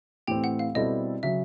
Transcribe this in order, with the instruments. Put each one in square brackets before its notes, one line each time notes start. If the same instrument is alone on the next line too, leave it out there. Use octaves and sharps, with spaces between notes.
[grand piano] A2 E3 A3 C4 [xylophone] G4 G5
[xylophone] F#5
F5
[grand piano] B2 G3 C4 E4 A4 [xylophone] D#5
[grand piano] C#3 F#3 [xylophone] E5